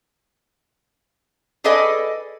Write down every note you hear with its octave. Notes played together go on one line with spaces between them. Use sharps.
G#4 A4 B4 D5 D#5 G#5